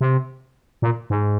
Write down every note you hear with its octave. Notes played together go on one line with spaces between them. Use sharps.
C3
A#2
G#2